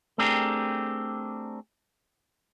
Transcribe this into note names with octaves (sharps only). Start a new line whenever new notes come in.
A3 C4 D4 G4 G#4 A#4